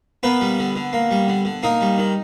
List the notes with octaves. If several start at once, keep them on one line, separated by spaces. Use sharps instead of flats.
A#3 B3 B4
G3
D3
D3
A#3
G3
D3
D3
A#3 D#4 D#5
G3
D#3